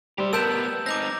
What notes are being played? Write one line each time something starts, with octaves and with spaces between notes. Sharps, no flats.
G3 G4 C5
A2 B3 A#4 A5 E6 G6 D7 E7
C4 D#4 D6 G6 A#6